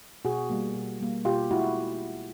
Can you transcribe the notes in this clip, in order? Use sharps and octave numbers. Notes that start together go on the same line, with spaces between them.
B2 F#4 G#4
G3 A#3
B2
G3 A#3
B2 F4 G4
G#3 E4 F#4